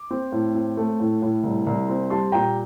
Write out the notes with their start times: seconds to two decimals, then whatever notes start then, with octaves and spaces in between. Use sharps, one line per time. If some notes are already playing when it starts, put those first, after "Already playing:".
Already playing: D6
0.11 C4
0.32 A2
0.55 C4
0.77 A3
1.00 A2
1.22 A2
1.43 C2
1.67 C2
1.89 C4
2.10 G3 A5 C6
2.32 A#2 G5 A#5